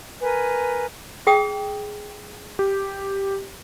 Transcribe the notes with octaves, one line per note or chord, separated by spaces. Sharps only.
A#4 B4 G#5
G#4 G5 D#6
G4